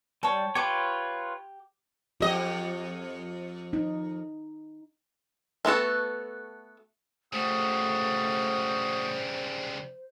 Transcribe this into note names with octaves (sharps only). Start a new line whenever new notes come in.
G3 C#5 A5
F4 G4 B4 C#5 D6
F2 F#4 G4 D#5
D#4
A3 B3 F#4 A4
C#3 G3 A3 F#4 C5 D#6